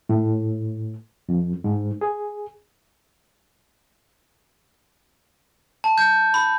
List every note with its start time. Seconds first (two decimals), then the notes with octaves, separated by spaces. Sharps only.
0.09 A2
1.29 F2
1.64 G#2
2.01 G#4
5.84 A5
5.98 G6
6.34 B5